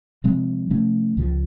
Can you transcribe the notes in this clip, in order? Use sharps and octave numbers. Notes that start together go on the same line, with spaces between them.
C3 F3 G#3 C4
C3 F3 A3 C#4
C#2 C#3 F3